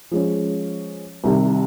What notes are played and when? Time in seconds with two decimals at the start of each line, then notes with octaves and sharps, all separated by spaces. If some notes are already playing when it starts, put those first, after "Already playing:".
0.11 F3 G#3 C#4
1.24 C2 C3 D#3